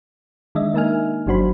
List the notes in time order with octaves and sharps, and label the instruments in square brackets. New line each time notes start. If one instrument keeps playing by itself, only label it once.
[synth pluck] D#3 G#3 D4 D#5 E5
A#3 D#4 A#4 E5 G#5 F6
G1 F#3 D4 F#4 C5 B5